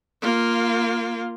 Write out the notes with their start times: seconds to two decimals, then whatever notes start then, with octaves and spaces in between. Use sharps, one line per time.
0.22 A#3 F4